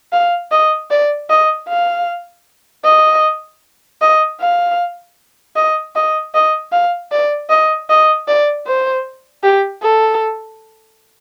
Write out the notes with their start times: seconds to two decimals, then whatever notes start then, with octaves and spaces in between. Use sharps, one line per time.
0.13 F5
0.51 D#5
0.91 D5
1.29 D#5
1.68 F5
2.84 D#5
4.01 D#5
4.40 F5
5.56 D#5
5.96 D#5
6.34 D#5
6.72 F5
7.12 D5
7.50 D#5
7.89 D#5
8.28 D5
8.67 C5
9.44 G4
9.83 A4